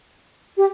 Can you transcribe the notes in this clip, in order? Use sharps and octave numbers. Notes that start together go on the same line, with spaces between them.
G4